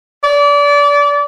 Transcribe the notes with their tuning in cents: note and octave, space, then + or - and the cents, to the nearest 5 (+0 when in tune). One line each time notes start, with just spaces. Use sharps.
D5 -30